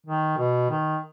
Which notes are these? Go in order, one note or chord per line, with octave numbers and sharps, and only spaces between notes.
D#3
B2
D#3